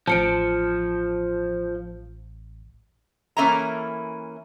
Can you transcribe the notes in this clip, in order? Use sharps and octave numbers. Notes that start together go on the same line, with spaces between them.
A1 F3 A5 C#7 D7
E3 A#3 C#4 E4 A4 A#5